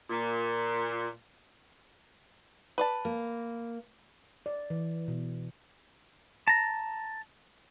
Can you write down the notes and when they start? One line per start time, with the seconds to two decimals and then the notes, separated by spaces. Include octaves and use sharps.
0.10 A#2
2.78 B4 D5 A5
3.05 A#3
4.46 D5
4.70 E3
5.08 B2
6.48 A5 A#5